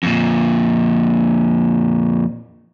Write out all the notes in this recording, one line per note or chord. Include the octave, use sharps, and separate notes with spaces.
F2 A#2